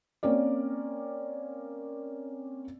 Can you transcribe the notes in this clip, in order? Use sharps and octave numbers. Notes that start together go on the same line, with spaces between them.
A#3 C4 C#4 A#4 D5